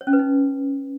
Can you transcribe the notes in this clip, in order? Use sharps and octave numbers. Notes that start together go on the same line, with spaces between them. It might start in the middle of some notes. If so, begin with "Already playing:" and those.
C#5
C#4
B4
D#4